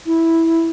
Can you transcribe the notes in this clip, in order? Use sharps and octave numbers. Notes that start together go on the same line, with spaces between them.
E4